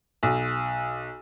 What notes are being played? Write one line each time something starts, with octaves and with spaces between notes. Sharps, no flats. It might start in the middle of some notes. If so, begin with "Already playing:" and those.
B1